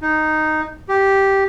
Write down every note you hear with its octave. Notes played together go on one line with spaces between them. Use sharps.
D#4
G4